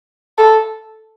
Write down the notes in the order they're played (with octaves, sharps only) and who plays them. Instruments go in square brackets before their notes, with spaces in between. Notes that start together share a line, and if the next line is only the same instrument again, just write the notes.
[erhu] A4